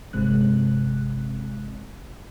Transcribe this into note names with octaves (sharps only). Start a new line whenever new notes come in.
G1 C3 G#3 C4 F#6